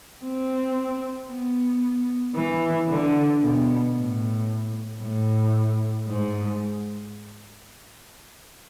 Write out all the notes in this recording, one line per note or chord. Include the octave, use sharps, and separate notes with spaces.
C4
B3
E3
D3
B2
A2
A2
G#2